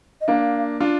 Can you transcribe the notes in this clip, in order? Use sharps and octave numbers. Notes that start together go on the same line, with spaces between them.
D#5
A#3 D4 F5
D4 F4